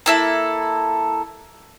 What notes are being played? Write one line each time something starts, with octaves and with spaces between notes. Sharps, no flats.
A#3 E4 A4